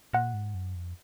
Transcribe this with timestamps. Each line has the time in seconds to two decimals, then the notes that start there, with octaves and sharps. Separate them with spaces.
0.13 A#2 F#5
0.34 G#2
0.54 F#2
0.75 F2